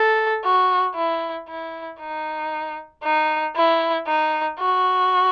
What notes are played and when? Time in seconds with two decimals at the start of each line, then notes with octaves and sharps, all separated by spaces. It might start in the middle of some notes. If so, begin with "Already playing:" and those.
Already playing: A4
0.44 F#4
0.95 E4
1.48 E4
1.99 D#4
3.03 D#4
3.56 E4
4.07 D#4
4.59 F#4